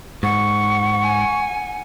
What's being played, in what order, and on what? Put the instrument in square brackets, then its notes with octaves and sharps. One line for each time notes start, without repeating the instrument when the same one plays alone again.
[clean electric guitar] G#2 [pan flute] F#5 [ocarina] C#6
[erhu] G#5